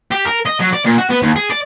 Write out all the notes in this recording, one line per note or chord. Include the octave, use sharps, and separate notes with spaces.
G4
A#4
D#5
F#3
D5
A#2
F#4
B3
D#2
G#4
D5